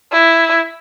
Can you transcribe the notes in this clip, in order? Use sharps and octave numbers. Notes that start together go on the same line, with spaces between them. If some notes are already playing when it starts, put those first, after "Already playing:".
E4